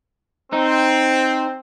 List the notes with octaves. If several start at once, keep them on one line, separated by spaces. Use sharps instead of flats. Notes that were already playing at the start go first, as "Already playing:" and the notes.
C4 D#4